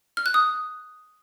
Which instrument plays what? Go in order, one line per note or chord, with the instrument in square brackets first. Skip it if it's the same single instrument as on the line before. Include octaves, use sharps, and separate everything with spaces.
[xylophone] F6
F#6
D#6